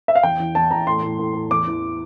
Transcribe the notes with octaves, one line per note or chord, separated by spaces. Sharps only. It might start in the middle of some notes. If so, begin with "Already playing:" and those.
E5
F5
E2 G5
E3
E2 A5
E2 A#5
A2 C6
A2
A2
A2
E2 D6
E3